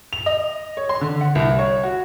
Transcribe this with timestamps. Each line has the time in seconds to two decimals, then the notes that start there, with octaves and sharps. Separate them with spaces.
0.13 F7
0.26 D#5
0.77 C#5
0.89 C6
1.01 D3
1.21 F#5
1.35 C2
1.59 C#5
1.83 F#4